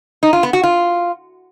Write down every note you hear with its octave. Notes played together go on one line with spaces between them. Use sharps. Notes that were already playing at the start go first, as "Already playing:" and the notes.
D#4
F4
B3
F#4
F4